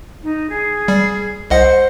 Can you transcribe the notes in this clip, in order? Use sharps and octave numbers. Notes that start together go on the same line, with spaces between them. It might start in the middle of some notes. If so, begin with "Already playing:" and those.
D#4
G#4
G3
C2 C5 D#5 F#5